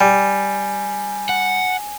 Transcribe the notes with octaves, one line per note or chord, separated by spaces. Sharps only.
G3 G#5
F#5